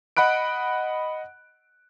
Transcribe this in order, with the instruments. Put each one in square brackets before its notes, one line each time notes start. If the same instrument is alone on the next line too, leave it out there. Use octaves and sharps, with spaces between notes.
[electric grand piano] D#5 F#5 B5 F#6 D7